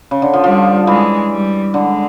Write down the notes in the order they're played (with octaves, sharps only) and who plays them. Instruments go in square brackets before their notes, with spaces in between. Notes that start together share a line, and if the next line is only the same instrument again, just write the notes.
[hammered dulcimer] C#3
D3
F3
[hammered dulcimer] F3 [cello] G3
[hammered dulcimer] E3 [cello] G#3
[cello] G3
[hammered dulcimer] D3 [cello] G#3